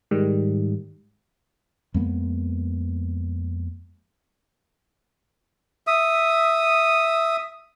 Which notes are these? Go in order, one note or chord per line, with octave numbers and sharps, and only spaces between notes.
G#2 D#3 G3
F2 G#3 A#3 B3
E5 D#6